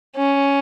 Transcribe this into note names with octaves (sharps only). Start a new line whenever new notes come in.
C#4